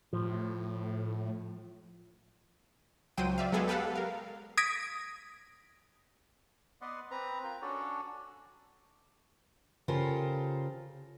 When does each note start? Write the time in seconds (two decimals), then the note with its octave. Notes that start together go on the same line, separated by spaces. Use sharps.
0.13 A2 F3
3.17 C#2 F#3 C5 G5 D#7
3.38 D5 E5 F5
3.52 F#3 G#3 B3 G#4 A4
3.68 G4 A4 B4 F5 F#5
3.95 A#4 F5
4.57 D#6 G#6 A#6 B6 D7
6.81 B3 B4 D5 D#5 F#5 C6
7.11 C4 B4 A#5
7.44 F4 A#4 G5 A#5
7.62 C#4 D4 F#4 A4 C#5 D5
9.88 C#3 F4 G4 A4 A#4 C5